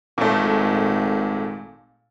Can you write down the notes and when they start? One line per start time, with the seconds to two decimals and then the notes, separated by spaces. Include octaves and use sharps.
0.18 G#1 A#2 A3